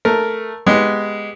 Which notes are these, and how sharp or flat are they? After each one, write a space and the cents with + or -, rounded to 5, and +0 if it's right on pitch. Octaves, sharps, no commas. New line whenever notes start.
A3 +0 A#4 +0
G#3 +0 B3 +0 G4 +0